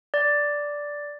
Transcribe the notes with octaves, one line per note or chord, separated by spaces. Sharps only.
D5